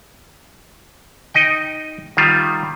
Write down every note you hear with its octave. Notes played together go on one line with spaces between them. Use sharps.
D#4 D#5 G5
D#3 G3 F4